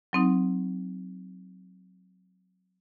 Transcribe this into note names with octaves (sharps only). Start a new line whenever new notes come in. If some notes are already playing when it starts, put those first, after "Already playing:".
F#3 C4 D#4